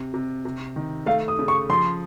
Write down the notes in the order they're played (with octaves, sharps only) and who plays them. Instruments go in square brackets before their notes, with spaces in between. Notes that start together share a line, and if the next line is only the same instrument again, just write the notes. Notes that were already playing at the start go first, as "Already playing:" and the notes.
Already playing: [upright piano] C3
C3
C3
D#3
[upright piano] A3 [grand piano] F5
[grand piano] D#6
[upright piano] C#3
[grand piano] C#6
[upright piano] F3 [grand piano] C6